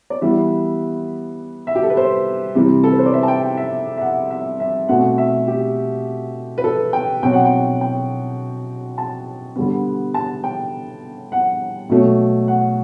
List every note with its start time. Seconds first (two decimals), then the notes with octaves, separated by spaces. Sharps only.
0.10 D5
0.21 E3 G3 B3 E5
1.67 E5
1.75 G4
1.83 A4
1.90 B4
1.97 C5
2.55 C3 E3 G3 C4
2.84 A4
2.92 B4
2.99 C5
3.06 D5
3.14 E5
3.23 A5
3.28 G5
3.43 G5
3.57 E5
3.97 E5
4.01 F#5
4.31 E5
4.60 E5
4.89 B2 A3 C4 F#5
5.18 E5
5.47 G4
6.58 B4
6.64 A4
6.93 G5
7.23 B2 F#3 C4 G5
7.33 F#5
7.45 G5
7.81 G5
8.98 A5
9.56 D3 G3 B3
10.14 A5
10.44 G5
11.32 F#5
11.89 B2 F#3 A3
12.48 F#5